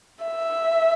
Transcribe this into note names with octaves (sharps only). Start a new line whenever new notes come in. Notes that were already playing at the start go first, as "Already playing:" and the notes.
E5